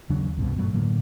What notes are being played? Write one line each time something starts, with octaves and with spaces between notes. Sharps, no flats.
D#2 C#3 F#3 D4
C2 G2 B2
F#2 A#2 F#3 A3
A2 D3 F#3 A#3